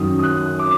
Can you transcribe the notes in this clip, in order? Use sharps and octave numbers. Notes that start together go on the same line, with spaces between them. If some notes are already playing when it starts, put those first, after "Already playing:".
Already playing: F#2 D#3 F#3 D#6
D#6
F#6
D6